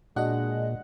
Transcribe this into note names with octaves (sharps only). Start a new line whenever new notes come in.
A#2 G#3 D4 F#4 D#5 F#5